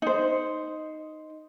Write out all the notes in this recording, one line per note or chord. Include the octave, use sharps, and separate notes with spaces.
D#4 C5